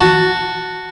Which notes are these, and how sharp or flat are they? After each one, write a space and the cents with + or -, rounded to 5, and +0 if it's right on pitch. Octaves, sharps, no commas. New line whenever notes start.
F#4 +0 A5 +10